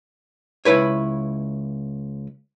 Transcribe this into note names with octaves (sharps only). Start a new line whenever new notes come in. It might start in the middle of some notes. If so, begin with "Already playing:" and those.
C#2 G#2 E4 B4 C#5